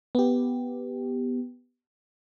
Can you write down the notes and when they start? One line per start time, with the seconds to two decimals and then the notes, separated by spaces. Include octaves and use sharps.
0.15 B3 G4